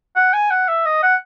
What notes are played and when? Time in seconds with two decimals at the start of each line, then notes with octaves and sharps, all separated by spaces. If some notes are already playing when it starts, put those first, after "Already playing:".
0.16 F#5
0.33 G#5
0.51 F#5
0.68 E5
0.85 D#5
1.03 F#5